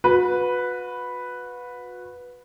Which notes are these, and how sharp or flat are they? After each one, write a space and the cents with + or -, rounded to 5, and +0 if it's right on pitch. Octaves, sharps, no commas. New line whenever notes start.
F#4 -35 B4 +0